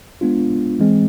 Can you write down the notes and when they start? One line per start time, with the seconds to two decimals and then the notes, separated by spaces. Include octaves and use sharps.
0.21 G#3 B3 D4 F4
0.79 E3 G#3 C4